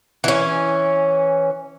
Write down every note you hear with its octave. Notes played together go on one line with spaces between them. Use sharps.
E3 C#4